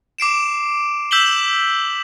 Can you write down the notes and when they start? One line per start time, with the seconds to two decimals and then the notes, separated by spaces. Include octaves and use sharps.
0.18 D6 C7 D7 E7
1.11 E6 G6 B6 E7 F#7 G7